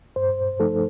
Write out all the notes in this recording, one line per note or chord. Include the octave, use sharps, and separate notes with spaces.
G2 C5
F3 A3 D#4 A4